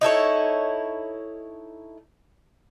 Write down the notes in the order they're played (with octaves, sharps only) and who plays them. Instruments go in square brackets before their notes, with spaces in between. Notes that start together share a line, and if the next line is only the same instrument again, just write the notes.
[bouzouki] D#4 E4 A4 C#5